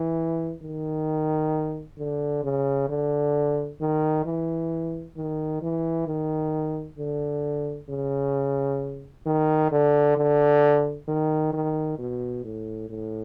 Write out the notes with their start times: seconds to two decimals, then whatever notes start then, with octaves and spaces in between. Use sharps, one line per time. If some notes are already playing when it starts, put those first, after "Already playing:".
Already playing: E3
0.62 D#3
1.98 D3
2.44 C#3
2.89 D3
3.81 D#3
4.25 E3
5.17 D#3
5.62 E3
6.07 D#3
6.98 D3
7.90 C#3
9.26 D#3
9.72 D3
10.17 D3
11.08 D#3
11.53 D#3
11.99 B2
12.44 A2
12.90 A2